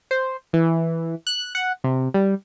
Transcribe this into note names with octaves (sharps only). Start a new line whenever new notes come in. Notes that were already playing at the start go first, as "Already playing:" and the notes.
C5
E3
F#6
F#5
C3
G3